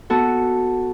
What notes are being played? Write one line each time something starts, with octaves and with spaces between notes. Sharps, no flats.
B3 F#4 A4